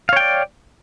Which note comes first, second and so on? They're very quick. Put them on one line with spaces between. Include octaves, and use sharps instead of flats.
F5 C#5 G5 D5